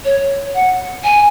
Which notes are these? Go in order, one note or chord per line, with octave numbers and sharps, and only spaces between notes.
C#5
F#5
G#5